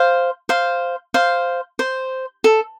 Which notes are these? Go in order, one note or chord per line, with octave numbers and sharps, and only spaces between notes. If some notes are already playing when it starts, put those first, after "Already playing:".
Already playing: C5 F5
C5 F5
C5 F5
C5
A4